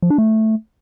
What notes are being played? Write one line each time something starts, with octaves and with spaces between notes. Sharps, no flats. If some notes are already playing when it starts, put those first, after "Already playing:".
F3
D4
A3